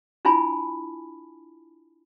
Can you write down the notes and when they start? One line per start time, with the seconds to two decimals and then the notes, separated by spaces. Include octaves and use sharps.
0.25 D4 E4 F4 G#5 A5 B5